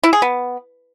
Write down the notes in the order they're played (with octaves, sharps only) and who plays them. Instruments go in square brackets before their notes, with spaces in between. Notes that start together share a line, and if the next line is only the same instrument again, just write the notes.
[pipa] E4
G#4
B3